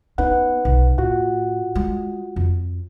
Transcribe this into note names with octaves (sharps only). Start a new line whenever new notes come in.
B3 C#4 D#4 B4 F#5
B1
A2 F4 F#4 F#5
G#3
F2